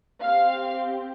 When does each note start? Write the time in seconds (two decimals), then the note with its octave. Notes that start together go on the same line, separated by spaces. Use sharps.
0.21 C4 G4 F5